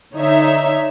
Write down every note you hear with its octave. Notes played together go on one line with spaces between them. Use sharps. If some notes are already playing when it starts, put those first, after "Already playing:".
D3 D#4 C#5 E5